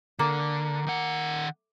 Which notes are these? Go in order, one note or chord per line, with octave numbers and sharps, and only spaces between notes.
D3 A#3
D#3 F#5